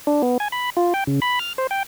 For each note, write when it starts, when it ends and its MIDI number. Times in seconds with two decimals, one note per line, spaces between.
0.07 0.22 62
0.22 0.38 59
0.40 0.48 80
0.52 0.70 83
0.77 0.93 65
0.94 1.04 79
1.07 1.20 49
1.22 1.39 83
1.39 1.53 89
1.58 1.67 72
1.71 1.83 79